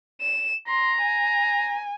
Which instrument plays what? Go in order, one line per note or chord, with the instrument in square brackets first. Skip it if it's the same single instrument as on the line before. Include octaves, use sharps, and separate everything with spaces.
[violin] E7
[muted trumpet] A#5 [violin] C6
[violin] G#5